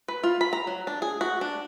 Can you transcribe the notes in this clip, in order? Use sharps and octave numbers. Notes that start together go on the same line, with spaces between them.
B4
F4
B5
A#5
F#3
D4
G#4
F#4
D4